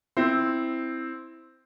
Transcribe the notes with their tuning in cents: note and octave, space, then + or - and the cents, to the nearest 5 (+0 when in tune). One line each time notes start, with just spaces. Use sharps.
C4 +0 E4 -5